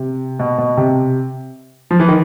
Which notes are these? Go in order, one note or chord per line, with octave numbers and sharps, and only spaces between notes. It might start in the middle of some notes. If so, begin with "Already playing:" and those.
Already playing: C3
B2
B2
C3
F3
E3
D#3